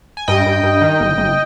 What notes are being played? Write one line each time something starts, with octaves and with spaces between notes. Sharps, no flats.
G#5
G2 D#5 G5
G2
G2
D#3
G1
G1